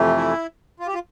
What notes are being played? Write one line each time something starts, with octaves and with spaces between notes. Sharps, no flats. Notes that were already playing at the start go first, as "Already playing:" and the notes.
Already playing: F2 C3 E3 A3
E4
F4
G4
F4